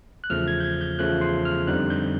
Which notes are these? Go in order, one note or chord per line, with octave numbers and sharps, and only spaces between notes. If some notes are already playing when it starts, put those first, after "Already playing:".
F#6
E2 C#3 F3 A3 F6
G#6
G6
G#6
G6
E2 C#3 F3 A3 F#6
C6
F6
F2 D3 G3 C4 D#4 F#6
G6